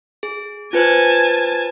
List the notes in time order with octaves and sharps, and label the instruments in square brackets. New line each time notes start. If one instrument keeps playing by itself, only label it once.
[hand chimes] G#4
[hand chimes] F4 B4 C5 [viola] G#5 A5